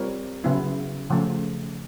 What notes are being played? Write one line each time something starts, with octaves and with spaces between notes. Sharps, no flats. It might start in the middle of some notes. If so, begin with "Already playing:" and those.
Already playing: G3 C4 F4 A#4 C#5
C#3 F#3 B3 E4
C#3 F3 A3